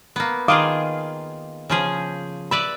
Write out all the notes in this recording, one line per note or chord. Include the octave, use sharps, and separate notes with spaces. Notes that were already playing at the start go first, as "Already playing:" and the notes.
A#3 B3
D#3 F4 G#4 F5 D6 D#6
C#3 F3 G#4
B4 D5 E5 B5